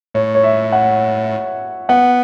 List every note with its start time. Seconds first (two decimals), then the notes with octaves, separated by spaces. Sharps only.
0.14 A2 C#5
0.35 C#5
0.44 E5
0.73 F#5
1.89 B3 F#5